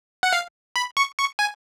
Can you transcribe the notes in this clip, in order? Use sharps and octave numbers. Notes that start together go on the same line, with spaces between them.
F#5
F5
B5
C#6
C#6
G#5